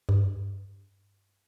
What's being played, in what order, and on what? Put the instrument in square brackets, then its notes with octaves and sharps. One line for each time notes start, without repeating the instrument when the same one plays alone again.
[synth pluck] G2